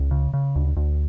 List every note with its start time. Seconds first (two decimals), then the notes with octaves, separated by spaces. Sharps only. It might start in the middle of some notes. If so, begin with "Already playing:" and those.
Already playing: C#2
0.11 C#3
0.34 C#3
0.56 D2
0.77 D2